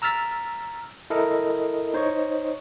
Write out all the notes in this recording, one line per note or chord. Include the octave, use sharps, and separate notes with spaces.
A#5 E6 F6 A6 B6
E4 A4 A#4 D#5
D#4 C5 C#5 D#5 C#6